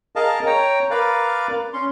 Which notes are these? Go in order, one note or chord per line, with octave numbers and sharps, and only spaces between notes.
G#4 A#4 D#5 F5 A5
C#5 G5 A#5
A#4 B4 D5 F5
C#4 C6